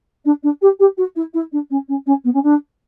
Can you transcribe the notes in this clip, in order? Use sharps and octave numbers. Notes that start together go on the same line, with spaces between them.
D4
D4
G4
G4
F#4
E4
E4
D4
C#4
C#4
C#4
B3
C#4
D4